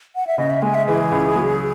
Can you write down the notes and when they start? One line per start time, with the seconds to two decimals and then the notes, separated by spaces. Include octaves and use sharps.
0.16 F#5
0.27 E5
0.38 C#3 D#5
0.50 E5
0.62 G#3 G#5
0.74 E5
0.87 E3 G#4
1.12 C#2
1.36 F#3